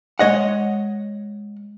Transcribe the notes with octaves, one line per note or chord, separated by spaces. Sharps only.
G#3 C#5 D#5 F#5